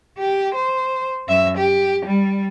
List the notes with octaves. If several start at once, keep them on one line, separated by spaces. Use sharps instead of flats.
G4
C5
F#2 E5
G4
G3